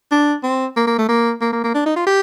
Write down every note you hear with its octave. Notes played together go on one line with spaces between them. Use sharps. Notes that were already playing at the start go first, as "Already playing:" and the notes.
D4
C4
A#3
A#3
A3
A#3
A#3
A#3
A#3
D4
D#4
F4
G4